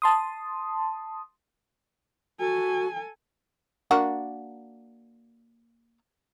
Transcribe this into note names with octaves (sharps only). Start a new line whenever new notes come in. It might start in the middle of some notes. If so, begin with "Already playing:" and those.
A5 C6 D#6
F#4 A4 G#5
A#3 D4 F#4